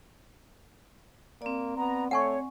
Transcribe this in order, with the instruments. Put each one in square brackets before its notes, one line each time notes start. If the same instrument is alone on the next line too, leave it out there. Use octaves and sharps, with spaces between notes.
[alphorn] A#3 [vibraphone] C4 D5
[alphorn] B3 [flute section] A#5
[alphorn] A3 [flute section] C#5 [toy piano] F#5 G#5 C#6